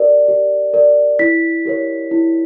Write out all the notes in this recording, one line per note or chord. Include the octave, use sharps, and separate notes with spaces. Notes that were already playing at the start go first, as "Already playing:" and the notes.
Already playing: G4 A#4 D5
G4
A#4 D5
E4 B6
G4 A#4 C#5
E4